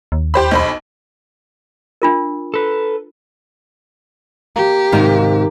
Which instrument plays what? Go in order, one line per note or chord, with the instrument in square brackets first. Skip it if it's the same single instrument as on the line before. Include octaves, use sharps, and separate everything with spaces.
[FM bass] D#2
[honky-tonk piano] G4 C5 B5
B1 C5 B5
[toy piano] D4 F4 A#4
[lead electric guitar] A4 B4
[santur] A#3 [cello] G4
[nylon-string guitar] G#2 C3 [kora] D#3 A#4 F5 [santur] A#3